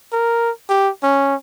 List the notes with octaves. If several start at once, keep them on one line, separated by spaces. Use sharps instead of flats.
A#4
G4
C#4